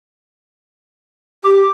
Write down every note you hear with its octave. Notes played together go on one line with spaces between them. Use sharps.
G4 D6